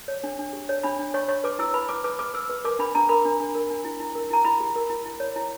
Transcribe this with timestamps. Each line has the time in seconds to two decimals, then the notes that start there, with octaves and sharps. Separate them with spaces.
0.08 C#5
0.24 D4
0.39 D4
0.53 G4
0.69 C#5
0.83 D4 B5
0.99 D4
1.14 C#5 C#6
1.28 C#5 C#6
1.44 B4 D6
1.59 E4 E6
1.74 B4 B5
1.89 B4 D6
2.04 B4 D6
2.19 B4 D6
2.34 B4 E6
2.49 B4
2.64 A#4 D6
2.79 D4 B5
2.95 D4 A#5
3.09 A#4 B5
3.25 D4
3.40 D4
3.55 A#4
3.70 D4
3.85 E4
4.00 E4
4.15 A#4
4.30 E4 A#5
4.45 E4 B5
4.60 G4
4.76 A#4
4.90 E4
5.05 E4
5.20 C#5
5.36 E4